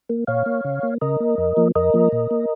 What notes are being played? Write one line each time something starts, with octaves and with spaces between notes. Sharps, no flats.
A#3
A#2 C#5 F5
A#3
C#3
A#3
C#3 A#4 D#5
A#3
F2
F3 A#3
F2 A#4 D#5
F3 A#3
A#2
A#3